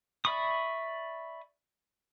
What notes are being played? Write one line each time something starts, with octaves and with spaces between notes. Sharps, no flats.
D5 E5 B5 C#6 D#6